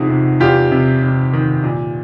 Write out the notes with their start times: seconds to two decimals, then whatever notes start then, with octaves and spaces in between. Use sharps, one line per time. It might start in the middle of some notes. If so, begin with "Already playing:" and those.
Already playing: E2 C3 F3 D#4 F#4 G#4
0.10 C3
0.40 E2 F4 G4
0.72 C3
1.03 C3
1.33 D#3
1.64 A#2